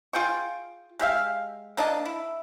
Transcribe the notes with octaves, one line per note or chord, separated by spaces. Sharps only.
F4 G#4 G5 C#6
G#3 G4 E5 F5
A#3 D4 D#5 A5
E4